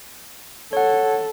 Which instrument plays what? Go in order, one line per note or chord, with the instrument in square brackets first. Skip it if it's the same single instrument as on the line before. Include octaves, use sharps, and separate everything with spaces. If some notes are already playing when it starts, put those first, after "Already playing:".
[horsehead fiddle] A4 [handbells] C#5 F#5